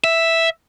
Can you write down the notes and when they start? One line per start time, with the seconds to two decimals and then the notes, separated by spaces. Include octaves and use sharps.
0.04 E5